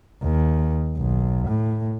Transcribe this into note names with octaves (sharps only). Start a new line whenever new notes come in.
D#2
B1
A2